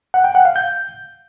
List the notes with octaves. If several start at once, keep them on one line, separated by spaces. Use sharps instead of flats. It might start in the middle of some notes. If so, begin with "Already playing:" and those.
F#5
G5
F#5
F5
G6